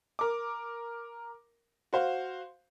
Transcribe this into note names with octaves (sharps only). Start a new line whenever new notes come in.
A#4 D6
F#4 C5 F5